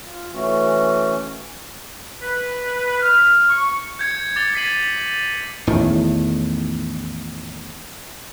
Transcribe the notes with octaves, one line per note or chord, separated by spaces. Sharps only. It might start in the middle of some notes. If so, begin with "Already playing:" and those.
F4
E3 A3 C#4 F#4
B4
F6
C#6
G6 G#6 C#7
D6 A6 F7 G7
G#6 B6 C7 D#7 F#7
A1 E2 A2 D#3